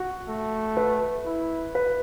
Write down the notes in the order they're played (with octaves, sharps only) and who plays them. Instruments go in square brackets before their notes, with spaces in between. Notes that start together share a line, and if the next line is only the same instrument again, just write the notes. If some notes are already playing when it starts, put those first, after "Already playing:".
Already playing: [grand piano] F#4
[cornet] A3
[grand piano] B4
[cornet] E4
[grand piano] B4